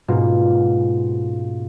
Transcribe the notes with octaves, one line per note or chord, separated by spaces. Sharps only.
G#2 B2 A#3 C#4 F4